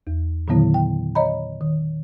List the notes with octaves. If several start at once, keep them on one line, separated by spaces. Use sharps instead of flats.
E2
A#2 D3 D#3 F#3 B3 E4
G5
C#5 D#5 A#5 B5
D#3